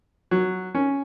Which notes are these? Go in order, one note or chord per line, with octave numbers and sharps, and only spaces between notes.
F#3
C#4